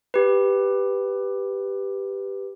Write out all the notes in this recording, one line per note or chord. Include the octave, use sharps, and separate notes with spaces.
G4 B4